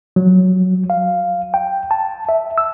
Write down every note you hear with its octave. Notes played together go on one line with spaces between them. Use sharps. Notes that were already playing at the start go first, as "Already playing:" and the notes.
F#3
F5
G5
A5
E5
E6